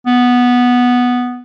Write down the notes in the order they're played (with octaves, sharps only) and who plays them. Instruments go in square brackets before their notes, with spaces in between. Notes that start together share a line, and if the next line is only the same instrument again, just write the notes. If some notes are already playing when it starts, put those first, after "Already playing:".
[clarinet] B3